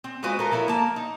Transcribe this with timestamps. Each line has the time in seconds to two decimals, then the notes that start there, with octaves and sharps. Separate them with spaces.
0.04 C4
0.23 G#3 F4 F#4 B4 C5
0.39 A4 A#4
0.52 F3 E4 A#4 B4 C#5
0.68 A#3 A5
0.96 D#4